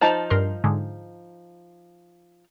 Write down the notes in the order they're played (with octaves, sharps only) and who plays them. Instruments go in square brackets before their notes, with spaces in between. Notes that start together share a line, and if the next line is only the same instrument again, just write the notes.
[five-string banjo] F3 D#4 A5
[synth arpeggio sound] G2 A#4 C6
G#2 D3 G#3